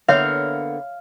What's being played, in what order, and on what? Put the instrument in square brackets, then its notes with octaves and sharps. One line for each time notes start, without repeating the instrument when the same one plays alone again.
[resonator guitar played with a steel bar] D3 A#3 B3 [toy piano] C#5 E5 [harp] F5 F6